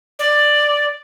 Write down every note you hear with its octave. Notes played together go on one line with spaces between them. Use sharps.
D5